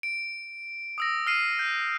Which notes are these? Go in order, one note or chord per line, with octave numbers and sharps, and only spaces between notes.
D7
D#6 E6 A#6
F6 C7 D#7
G6